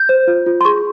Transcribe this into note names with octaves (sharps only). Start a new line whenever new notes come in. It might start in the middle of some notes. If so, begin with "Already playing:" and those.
Already playing: G6
C5
F4
F4
C6
G#4 C#6